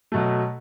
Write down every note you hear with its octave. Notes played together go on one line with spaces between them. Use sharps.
B2 F#3 A3